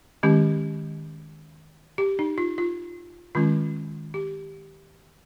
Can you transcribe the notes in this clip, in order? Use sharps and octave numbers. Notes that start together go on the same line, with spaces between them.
D#3 G#3 C#4 G4
G4
D#4
F4
F4
D#3 G#3 C#4 F4
G4